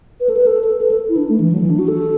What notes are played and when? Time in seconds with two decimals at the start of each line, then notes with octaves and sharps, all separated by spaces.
0.20 B4
0.29 A4
0.37 B4
0.47 A4
0.64 A4
0.81 B4
0.91 A4
1.09 E4
1.17 D4
1.29 A3
1.40 E3
1.52 F#3
1.61 E3
1.70 D4
1.79 F#4
1.88 A4